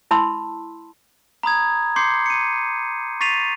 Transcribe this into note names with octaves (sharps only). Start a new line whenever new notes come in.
E4 A5 B5 C6 E6
A#5 B5 D#6 G#6
C6 D6 G6 C7 C#7
C#7 D#7
C#6 A6 B6 C7 D#7 F7